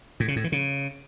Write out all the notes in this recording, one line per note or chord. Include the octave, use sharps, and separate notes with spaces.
A2
C#3
A2
E3
C#3